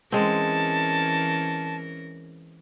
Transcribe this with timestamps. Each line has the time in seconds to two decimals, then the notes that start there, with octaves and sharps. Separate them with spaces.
0.12 E3 G#3 C4 C#4 A#4 A5